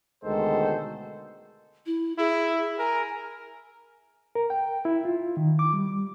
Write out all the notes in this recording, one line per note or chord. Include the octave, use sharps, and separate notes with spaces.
D2 B2 D#3 G#3 A4 C5
E4
E4 G#4
A#4 G#5
A#4
G5
E4
F4
D#3
D6
G3